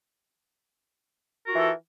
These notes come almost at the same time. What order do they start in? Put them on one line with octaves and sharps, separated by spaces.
A#4 F#4 F4 E3 A4